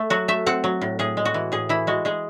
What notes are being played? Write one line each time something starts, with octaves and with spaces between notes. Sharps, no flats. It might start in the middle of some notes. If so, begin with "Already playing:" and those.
Already playing: A3
F#3 F#4
A3 E5
C4 F#5
F#3
A2
A2 G#4
G#3
F#4
E3
A2 G#4
E3 E4
G#3 F#4
G#3 G#4